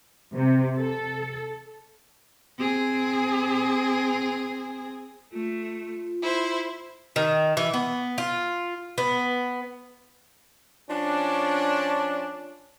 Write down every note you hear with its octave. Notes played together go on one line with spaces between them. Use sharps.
C3
A4
C4 G#4
A3 F4
E4 C5
D#3
E3
B3
F4
B3
F3 C#4 D4